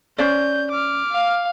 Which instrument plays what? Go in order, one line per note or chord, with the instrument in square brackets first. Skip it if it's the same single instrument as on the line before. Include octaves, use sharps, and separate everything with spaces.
[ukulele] C#4 C5 D5 [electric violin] G6
[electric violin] D6 F6
[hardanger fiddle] F5